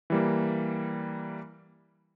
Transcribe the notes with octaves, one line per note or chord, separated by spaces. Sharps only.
E3 G3 A#3